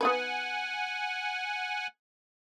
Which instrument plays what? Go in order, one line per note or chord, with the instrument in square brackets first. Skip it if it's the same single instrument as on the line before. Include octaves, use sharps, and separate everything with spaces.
[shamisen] B3 D#4 B4 [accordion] F#5 G#5